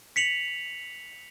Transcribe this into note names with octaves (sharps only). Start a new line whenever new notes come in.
B6 C#7 F7 F#7